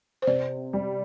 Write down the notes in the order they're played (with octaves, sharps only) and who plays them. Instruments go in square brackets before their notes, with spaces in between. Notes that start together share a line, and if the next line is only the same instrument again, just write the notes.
[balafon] C5
[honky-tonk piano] C3 [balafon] D5
[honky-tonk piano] G3